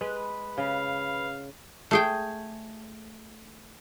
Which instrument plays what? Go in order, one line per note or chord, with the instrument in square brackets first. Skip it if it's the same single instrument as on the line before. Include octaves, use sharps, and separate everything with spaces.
[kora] G#3 [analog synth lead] B4
[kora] C#3 [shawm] F5
[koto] A3 G#4 G5